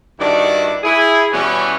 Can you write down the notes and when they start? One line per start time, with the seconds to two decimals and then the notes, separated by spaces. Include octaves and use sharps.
0.19 G2 D#3 D4 E4 F#4 D5
0.83 E4 G#4
1.32 B2 E3 G3 B3 C#4